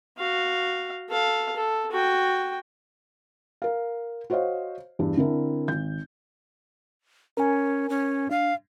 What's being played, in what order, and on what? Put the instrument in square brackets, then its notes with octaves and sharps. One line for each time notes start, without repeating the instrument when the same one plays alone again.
[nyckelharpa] F#4 F5
A4 F5
A4
F#4 G5
[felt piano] A#4 F5
F#4 C5 C#5 D#5 F5
E2 G2
D3 C4 E4 A#4
G#1 G6
[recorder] C#4 [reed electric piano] A#4 G#5
[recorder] C#4
[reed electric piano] D4 [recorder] F5